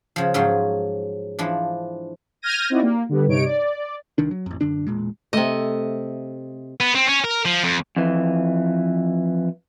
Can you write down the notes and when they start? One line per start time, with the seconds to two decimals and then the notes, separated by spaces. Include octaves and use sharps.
0.16 C#3 F3
0.34 G#2 F3 F#3 C#4 C6
1.39 E3 F3 D4
2.42 F6 G6 G#6 A#6 D#7
2.70 C4 D#4 E4 F#4 G4 D5
2.82 A#3
3.09 D3 G3 B3
3.26 G2 C3 D#4 C#5 D7
3.45 D5
4.18 C2 D#3 D4
4.31 F#3
4.46 A1 F2
4.61 F#2 D3 D4
4.87 E1 A#2 G#3
5.33 C3 A3 D#5
6.80 B3
6.95 C4
7.07 C#4
7.24 A#4
7.45 F3
7.64 F2
7.96 F2 E3